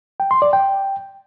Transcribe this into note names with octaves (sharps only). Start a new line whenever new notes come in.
G5
C6
D5
G5